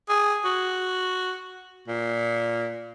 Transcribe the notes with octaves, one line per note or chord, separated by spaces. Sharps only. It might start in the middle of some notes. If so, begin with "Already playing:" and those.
G#4
F#4
A#2